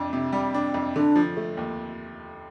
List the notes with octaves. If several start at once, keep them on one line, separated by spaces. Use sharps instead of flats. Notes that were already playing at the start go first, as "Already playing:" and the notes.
Already playing: F2 C3 D4
C3
G3
D4
F2
D3 D4
F3
A3
D#2